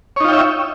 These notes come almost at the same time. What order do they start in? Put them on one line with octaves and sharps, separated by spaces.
C#5 D#4 F4 G5 E5